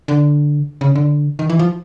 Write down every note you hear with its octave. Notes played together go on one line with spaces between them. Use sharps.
D3
C#3
D3
D#3
E3
F3